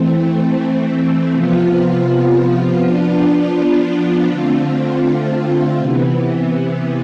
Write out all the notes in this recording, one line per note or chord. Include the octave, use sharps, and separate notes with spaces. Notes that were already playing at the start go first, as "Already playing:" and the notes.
Already playing: E3 A3 C4
C3 F3 B3 F4
F3 B3 D4 F4
D3 A3 C4 F4
C3 E3 B3